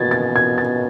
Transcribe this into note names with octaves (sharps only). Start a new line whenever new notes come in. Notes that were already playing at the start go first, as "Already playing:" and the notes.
Already playing: B2 G#6 A6
A6
G#6
A6